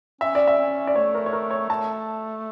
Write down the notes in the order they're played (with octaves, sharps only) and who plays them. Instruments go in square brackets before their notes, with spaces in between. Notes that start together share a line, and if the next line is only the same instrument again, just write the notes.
[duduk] C#4 [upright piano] E5
[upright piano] D5
E5
[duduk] C#4
[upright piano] D5
[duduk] A3 [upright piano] C#5
[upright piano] A#4
C#5
A#4
C#5
[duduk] A3 [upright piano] A5